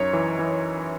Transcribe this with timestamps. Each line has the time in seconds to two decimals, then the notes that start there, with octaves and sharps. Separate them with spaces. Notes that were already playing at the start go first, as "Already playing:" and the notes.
Already playing: F#2 D#4 C#5
0.13 E3
0.39 E3